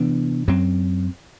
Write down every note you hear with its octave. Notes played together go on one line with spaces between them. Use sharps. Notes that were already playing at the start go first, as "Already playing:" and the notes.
Already playing: C3 E3 B3 D4
F#2 F#3 C4